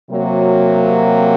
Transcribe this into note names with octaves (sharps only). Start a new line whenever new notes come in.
C3 F#3 A#3